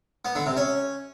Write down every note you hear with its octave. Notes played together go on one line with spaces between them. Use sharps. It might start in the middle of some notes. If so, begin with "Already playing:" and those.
B3
D3
C3
C#4